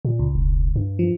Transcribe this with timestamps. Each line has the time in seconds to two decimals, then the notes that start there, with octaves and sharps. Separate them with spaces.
0.05 A#2
0.19 C#2
0.35 E1
0.76 G2
0.99 F3